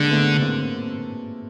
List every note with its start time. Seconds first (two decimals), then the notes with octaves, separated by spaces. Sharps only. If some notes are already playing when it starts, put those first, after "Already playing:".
Already playing: D3 G#3 A#3
0.10 A3 B3
0.41 A#3 C4